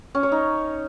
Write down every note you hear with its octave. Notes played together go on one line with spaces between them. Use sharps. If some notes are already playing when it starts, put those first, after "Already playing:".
C#4
C#5
D#4